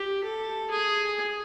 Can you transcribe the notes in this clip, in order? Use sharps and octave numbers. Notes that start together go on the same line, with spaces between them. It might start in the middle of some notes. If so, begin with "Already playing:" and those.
Already playing: G4
A4
G#4